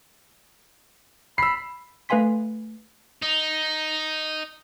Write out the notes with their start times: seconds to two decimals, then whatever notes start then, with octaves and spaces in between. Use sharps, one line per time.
1.38 B5 E6 C7
2.09 A3 B4 F5 G#5 C6 B6
3.22 D#4